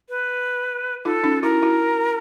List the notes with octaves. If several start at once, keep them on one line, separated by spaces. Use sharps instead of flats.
B4
D#4 F4 A4
C#4 D#4
E4 F#4 A#4
E4 F#4